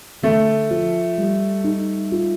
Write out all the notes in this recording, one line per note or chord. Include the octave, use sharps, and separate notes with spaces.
D3 A3
F3
G3
D#4
F4